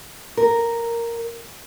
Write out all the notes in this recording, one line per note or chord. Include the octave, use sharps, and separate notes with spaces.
A#4